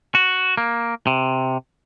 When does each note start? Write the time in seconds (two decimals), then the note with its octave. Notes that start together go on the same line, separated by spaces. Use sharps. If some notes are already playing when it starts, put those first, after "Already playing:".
0.15 F#4
0.57 A#3
1.07 C3